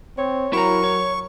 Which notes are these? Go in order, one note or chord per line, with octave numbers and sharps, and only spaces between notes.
C4 C#5
F#3 E4 A#4 A#5 C#6
C#5